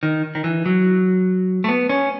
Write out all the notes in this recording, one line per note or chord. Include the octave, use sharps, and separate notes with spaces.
D#3
D#3
E3
F#3
A3
B3
C#4